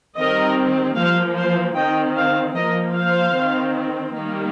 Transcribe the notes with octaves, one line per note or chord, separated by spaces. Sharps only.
D#3 G3 C4 A#4 D#5
F3 A#3 C5 F5
C5 F5
D#3 C4 D#5 G5
C5 F5
F3 A#3 A#4 D#5
C5 F5
D#3 C4
D#3 G3 A#3